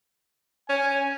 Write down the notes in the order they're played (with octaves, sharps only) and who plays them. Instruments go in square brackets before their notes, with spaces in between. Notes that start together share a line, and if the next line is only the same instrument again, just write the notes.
[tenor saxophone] C#4 [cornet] G#5